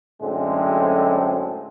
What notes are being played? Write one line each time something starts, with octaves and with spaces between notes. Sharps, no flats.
F#2 A2 D3 G#3 C4